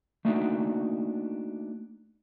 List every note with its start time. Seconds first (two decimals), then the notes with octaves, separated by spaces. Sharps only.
0.25 A3 A#3 D4 D#4 F#4